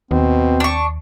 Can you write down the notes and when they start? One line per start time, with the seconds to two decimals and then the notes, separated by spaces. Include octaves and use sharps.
0.11 D#2 B2 C4
0.60 D4 C#6